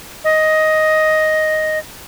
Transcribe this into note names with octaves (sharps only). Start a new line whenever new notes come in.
D#5